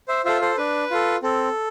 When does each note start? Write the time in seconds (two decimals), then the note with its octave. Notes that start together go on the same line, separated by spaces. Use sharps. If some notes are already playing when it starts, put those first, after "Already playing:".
0.08 C5 E5
0.25 F4 A4 C5 E5
0.41 A4 C5
0.57 D4 B4
0.91 F4 A4
1.23 C4 A4